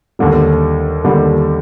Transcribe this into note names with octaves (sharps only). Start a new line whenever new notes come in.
D#2 D3 G3
D#2 D3 G3